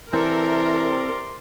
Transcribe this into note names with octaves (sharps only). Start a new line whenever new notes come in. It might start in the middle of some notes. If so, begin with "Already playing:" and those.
C3 E3 C4 A4 A#4 D5 C6